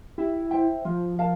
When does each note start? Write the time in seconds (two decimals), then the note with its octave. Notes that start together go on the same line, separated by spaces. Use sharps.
0.18 E4 G4
0.51 C5 E5 G5
0.85 F3 F4
1.19 A#4 F5 A5